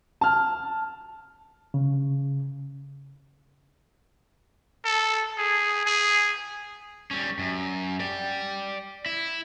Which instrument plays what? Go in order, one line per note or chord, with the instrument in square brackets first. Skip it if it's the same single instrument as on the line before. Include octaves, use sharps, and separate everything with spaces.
[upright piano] A5 F6
[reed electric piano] C#3
[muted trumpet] A4
G#4
G#4
[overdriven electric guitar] G3 C#4
F#2
D5 G5
E4